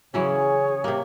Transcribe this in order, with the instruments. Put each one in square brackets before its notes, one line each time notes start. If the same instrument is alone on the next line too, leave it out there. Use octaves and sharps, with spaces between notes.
[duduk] C#3 [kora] E3 F#3 C#4 [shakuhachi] G#4 [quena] C#5
[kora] C3 A#3 [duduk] G4